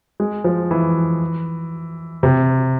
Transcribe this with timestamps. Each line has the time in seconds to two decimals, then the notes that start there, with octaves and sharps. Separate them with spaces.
0.20 G#3
0.44 F3
0.71 E3
2.23 C3